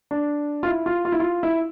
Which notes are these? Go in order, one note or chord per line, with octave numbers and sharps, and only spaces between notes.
D4
F4
E4
F4
F4
E4
F4
E4